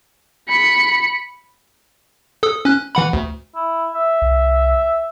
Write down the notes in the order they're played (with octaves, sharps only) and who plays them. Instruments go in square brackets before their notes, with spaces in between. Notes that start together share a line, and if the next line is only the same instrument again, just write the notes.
[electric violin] B5 C#7
[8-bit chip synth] A4 D#6 E6
C#4 F#6
E3 F#5 B5
D2
[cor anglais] E4
E5
[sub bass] C2